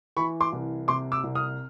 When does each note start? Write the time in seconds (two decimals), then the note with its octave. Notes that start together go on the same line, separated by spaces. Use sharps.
0.16 E3 B5 C#6
0.41 C6 D6
0.52 C2
0.88 C3 C6 D6
1.12 D6 E6
1.24 C2
1.35 D#6 F6